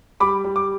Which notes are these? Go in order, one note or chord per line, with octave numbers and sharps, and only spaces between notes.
G3 B5 D6
G3
D6